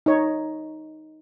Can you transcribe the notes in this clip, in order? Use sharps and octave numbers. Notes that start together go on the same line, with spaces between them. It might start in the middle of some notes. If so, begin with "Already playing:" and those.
D#4 C#5